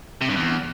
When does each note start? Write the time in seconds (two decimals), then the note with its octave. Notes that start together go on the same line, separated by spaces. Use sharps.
0.22 C3
0.29 G2
0.37 E2